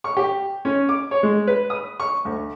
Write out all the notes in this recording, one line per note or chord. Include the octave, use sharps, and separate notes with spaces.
C#6
G4
C#4
D6
C#5
G#3
B4
D#6
C#6
D2